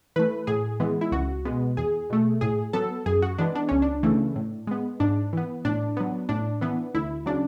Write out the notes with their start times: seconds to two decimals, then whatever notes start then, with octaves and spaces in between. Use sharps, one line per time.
0.16 E3 A3 B4
0.47 A2 G#4
0.80 E3 G#3 B3
1.01 E4
1.12 C#2 F#4
1.45 B2 G#3 B3
1.77 E2 G#4
2.10 B2 A3
2.41 A2 G#4
2.73 F#3 B3 A4
3.06 F#2 G#4
3.22 F#4
3.38 E3 G#3 B3 D4
3.55 D4
3.68 C#2 C#4
3.82 D4
4.03 C#3 E3 A3
4.36 A2
4.67 G#3 B3
5.00 G#2 D4
5.33 E3 B3
5.65 A2 D4
5.97 F#3 B3
6.29 A2 D4
6.61 E3 B3
6.94 D2 E4
7.26 C#3 F#3 D4